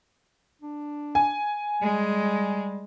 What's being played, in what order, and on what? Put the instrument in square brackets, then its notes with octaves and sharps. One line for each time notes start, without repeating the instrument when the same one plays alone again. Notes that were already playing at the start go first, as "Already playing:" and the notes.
[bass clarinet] D4
[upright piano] G#5
[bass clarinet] G3 [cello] G#3